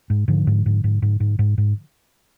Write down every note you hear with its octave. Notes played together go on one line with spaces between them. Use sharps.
G#2
G#2 D3 F3
G#2
G#2
G#2
G#2
G#2
G#2
G#2